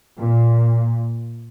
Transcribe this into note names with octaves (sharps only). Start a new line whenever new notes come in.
A#2